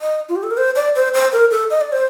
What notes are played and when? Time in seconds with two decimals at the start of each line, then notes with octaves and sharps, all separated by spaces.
0.01 D#5
0.29 F4
0.36 G4
0.43 A4
0.51 A#4
0.57 C5
0.76 D5
0.96 C5
1.14 C5
1.32 A#4
1.51 A4
1.70 D#5
1.81 D5
1.92 C5